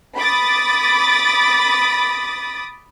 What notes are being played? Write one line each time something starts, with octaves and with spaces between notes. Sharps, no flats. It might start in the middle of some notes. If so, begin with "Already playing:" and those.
B5 D6 D#6 A6